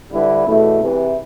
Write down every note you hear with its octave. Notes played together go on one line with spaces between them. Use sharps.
D3 G3 B3 E4 B4
E2 B2 A3 E4
E2 C3 E3